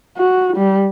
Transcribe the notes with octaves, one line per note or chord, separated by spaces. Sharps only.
F#4
G3